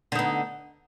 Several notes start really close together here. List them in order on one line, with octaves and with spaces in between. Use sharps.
D3 D#4 B3